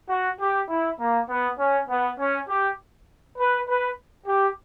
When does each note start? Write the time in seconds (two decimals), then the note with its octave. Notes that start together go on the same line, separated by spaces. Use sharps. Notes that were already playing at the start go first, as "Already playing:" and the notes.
0.09 F#4
0.39 G4
0.69 E4
1.00 A#3
1.29 B3
1.58 C#4
1.89 B3
2.18 C#4
2.48 G4
3.38 B4
3.68 B4
4.27 G4